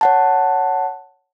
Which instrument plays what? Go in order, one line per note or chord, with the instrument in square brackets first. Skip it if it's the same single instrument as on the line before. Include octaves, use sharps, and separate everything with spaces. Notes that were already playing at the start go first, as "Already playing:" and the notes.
[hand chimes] C#5 F#5 A5